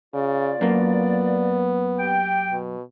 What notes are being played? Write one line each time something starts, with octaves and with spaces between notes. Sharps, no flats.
C#3 F4 D5
F#2 A#3 B3
G4 G5
B2